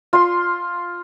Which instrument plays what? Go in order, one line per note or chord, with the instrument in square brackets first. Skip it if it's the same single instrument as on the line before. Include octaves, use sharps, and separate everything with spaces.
[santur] F4 C6